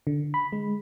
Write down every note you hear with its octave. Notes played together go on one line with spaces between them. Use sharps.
D3
B5
G#3